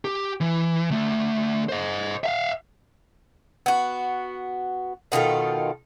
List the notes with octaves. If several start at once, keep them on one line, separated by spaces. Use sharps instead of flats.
G4
E3
D2 A3
C5 D#5
E5 F5
B3 F#4
B2 D#3 F4 A4